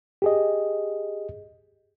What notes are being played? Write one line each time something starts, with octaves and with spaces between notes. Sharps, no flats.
G4 G#4 D#5